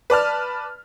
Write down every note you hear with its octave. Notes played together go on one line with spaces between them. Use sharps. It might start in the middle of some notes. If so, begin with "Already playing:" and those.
B4 D5 A5 F6